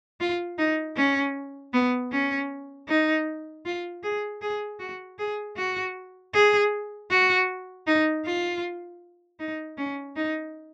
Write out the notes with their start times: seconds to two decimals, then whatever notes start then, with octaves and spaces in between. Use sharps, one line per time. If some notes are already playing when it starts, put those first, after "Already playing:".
0.20 F4
0.58 D#4
0.96 C#4
1.73 B3
2.11 C#4
2.88 D#4
3.65 F4
4.04 G#4
4.42 G#4
4.79 F#4
5.19 G#4
5.57 F#4
6.34 G#4
7.11 F#4
7.87 D#4
8.25 F4
9.39 D#4
9.78 C#4
10.16 D#4